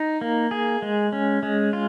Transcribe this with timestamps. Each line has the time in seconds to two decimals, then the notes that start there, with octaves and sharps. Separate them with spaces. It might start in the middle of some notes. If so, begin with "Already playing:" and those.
Already playing: D#4
0.21 A#3
0.51 G#4
0.82 G#3
1.13 C#4
1.43 G#3
1.73 F4